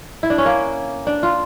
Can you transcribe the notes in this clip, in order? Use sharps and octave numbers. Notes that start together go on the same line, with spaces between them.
E4
D4
C#4
A#3
D4
F4